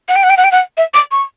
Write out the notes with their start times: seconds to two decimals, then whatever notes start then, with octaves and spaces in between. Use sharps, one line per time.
0.09 F#5
0.16 G5
0.23 F#5
0.30 G5
0.37 F#5
0.44 G5
0.52 F#5
0.77 E5
0.94 D6
1.12 C#6